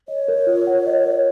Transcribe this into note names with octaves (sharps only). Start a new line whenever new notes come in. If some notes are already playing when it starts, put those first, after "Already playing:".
C#5 D#5
A#4
F4
F#5
D#5
A#4